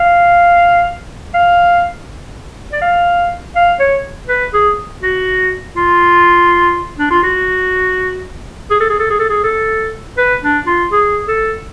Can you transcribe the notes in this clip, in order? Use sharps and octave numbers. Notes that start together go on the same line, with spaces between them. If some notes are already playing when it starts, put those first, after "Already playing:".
Already playing: F5
F5
D5
F5
F5
C#5
B4
G#4
F#4
F4
D4
F4
F#4
G#4
A4
G#4
A4
G#4
A4
G#4
A4
B4
D4
F4
G#4
A4